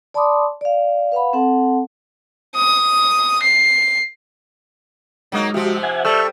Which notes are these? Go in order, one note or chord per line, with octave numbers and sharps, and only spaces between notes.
D5 A5 B5 C6 D6 D#6
D5 F5
B4 F5 F#5 B5
C4 A4 F#5 A5
D#6
C7
G1 F#3 G#3 A#3 D#4 D#6
C3 F3 C4 F#4 G4 E5
E5 F#5 G#5 G#6
G3 A4 E5 C#6 E6 F6 G6